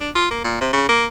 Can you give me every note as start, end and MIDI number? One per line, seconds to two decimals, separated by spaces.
0.01 0.10 62
0.15 0.28 65
0.30 0.43 58
0.44 0.60 46
0.61 0.71 48
0.73 0.84 49
0.89 1.05 58